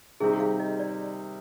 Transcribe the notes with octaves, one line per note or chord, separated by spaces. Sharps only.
C3 D#3 G3 C4 D#4 G#4
F5
D#5
D5